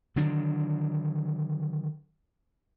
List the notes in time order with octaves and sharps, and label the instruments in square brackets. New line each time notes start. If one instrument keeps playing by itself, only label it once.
[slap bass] D3 D#3 F#3 D4